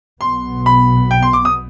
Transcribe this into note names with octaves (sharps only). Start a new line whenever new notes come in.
B1 B2 B3 C6
B5
G5
C6
D6
D#6